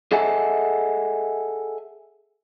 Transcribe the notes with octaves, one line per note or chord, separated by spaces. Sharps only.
G#4 A4 D#5 E5 F#5 G#5